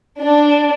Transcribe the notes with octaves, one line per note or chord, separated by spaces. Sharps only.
D4